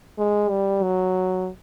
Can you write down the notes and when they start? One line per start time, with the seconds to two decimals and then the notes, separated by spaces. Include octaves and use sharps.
0.18 G#3
0.50 G3
0.82 F#3